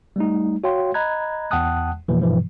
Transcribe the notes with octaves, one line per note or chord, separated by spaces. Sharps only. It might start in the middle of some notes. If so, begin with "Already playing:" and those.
G3 A3 D#4
F#4 C#5 F5 G5 C6
D#5 A#5 B5 F#6 G#6
E2 F#5 G5 A5 D#6 F#6
F2 B2 E3 F3 A#3
G2 B2 E3 F3